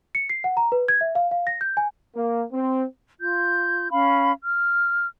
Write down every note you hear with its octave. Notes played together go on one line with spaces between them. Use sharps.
C#7
C7
F#5
A#5
B4
G#6
E5
F5
F5
A#6
G6
G#5
A#3
C4
F4 G6
C#4 F5 B5
F6